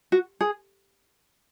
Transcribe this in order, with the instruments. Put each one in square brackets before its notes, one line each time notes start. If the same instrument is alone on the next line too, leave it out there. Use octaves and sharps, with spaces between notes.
[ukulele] F#4
G#4